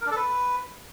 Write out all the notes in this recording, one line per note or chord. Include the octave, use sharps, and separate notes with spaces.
A#4
D4
A4
B4